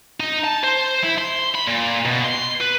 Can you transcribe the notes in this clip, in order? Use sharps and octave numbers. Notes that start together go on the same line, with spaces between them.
D#4
A5
C5
E4
C6
B5
A#2
B2
C6
B4